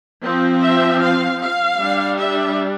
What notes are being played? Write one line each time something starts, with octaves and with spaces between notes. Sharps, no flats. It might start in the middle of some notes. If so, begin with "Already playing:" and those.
F3 C4
E5
F5
F5
G3 D4
E5